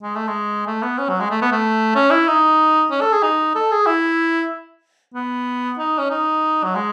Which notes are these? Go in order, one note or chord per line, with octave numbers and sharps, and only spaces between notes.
G#3
A3
G#3
A3
B3
C#4
F#3
G#3
A3
B3
A3
C#4
E4
D#4
C#4
A4
G#4
D#4
A4
G#4
E4
B3
D#4
C#4
D#4
F#3
G#3